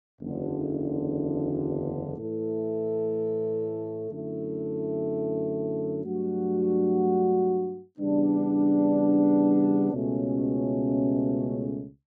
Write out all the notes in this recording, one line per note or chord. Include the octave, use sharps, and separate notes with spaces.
F#1 E2 D3
A2 E3 A3 E4 A4
F#2 D3 A3 E4 A4
G2 F#3 A3 D4 F#4
E2 C#3 G3 B3 D4
C#2 B2 A3 C#4